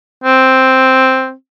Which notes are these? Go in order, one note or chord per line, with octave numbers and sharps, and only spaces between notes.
C4